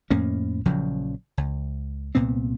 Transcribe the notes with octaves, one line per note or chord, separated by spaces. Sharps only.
F2 A2 A#3 C#4
A#1 C#3 F3 F#3
C#2
C2 A#2 B3 C4